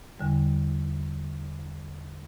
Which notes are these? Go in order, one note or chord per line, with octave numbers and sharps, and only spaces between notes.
E2 D3 G3